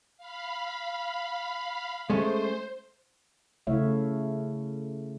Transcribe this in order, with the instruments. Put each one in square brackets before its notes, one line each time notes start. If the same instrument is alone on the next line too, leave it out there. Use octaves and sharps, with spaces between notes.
[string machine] F5 B5
[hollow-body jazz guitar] G#3 A3 C#4 [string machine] C5
[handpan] C#3 A3 E4 C#5 E5 F5